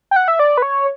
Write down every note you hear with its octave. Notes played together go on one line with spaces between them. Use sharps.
G5
F#5
E5
D5
B4
C#5